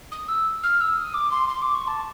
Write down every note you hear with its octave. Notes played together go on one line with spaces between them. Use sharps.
D#6
E6
F6
E6
D#6
D6
C6
C6
D6
C#6
A5